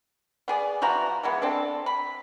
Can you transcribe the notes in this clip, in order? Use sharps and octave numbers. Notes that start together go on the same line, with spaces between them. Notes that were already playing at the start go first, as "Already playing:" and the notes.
B3 G#4 D5
E3 F3 F#4 A#5
E3 G#3 B3
C4 D4 A4
B5